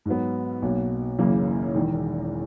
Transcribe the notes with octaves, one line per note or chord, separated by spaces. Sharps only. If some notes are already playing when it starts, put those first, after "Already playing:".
G#2 F#3 B3
B1 B2 A#3
F#1 F#2 C#3 E3 A#3
E1 E2 D#3